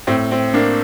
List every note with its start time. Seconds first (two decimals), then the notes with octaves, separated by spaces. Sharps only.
0.07 A2 C4
0.32 C4
0.54 A#3 D4